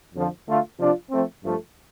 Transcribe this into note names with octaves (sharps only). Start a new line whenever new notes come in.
F2 D3 F3
D3 A3 F4
C3 F3 D4 F4
F3 A3 C4
G2 F3 A3